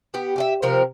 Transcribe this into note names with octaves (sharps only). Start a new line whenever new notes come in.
B3 G4
G4 G#4 E5
C3 F3 C4 A#4